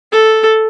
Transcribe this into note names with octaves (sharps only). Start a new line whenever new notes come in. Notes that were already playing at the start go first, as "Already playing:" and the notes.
A4